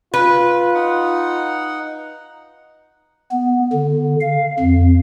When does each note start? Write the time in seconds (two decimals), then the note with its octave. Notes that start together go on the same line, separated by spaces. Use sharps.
0.14 F4 B4
0.74 D#4 F#5
3.32 B3
3.73 D3
4.20 F5
4.60 F2